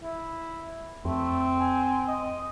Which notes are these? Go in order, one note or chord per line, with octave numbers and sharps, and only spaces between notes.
E4
F2 A3 C4
G#5
D#5